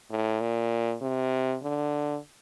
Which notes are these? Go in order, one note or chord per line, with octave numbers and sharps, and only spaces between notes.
A2
A#2
C3
D3